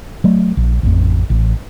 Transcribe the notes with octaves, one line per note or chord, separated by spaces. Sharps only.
F#3 A3
A#1
A1 F2
A1